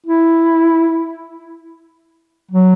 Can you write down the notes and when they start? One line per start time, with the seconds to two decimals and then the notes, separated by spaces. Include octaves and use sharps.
0.07 E4
2.52 F#3